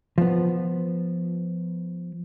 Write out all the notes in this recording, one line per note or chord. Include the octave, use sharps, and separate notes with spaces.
F3 B3